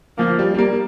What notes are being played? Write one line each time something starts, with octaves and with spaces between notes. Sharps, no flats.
F3 A#3
G3
G3
A#3